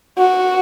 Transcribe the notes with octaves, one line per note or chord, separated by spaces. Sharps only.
F#4